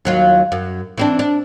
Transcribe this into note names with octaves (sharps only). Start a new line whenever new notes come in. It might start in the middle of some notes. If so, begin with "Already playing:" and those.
D#2 F#3 F4
F#2
E3 C4 D4
D4